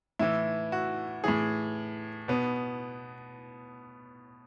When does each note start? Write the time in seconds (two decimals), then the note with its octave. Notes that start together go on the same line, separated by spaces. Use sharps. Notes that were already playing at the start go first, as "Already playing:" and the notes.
0.19 A2 E3 E4
0.72 F#4
1.24 A2 E3 G#4
2.28 B2 B3